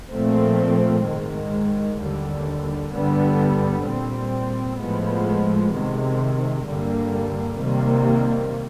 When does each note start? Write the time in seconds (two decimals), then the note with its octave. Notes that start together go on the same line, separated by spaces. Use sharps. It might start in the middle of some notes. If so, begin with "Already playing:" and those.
0.11 A#2 F3 A3 C4
1.04 G#2 D#3 G#3
1.98 D#2 D3 G3
2.91 G2 D3 G3 B3
3.85 A#2 G3 C4
4.79 A2 F3 G#3 B3
5.72 C3 D#3 G#3
6.65 G2 D3 G3 A#3
7.59 C3 D#3 G3 A#3